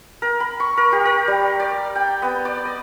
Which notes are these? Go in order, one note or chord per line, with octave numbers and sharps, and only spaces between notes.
A#4
B5
C#6
A#4
G4
A#4
G3
D5
G5
B3
D5
D#5